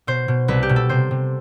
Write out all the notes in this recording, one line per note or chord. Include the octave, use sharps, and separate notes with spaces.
B2 C5
B2
C2 B4
G4
B2
A4
C3 C5
C3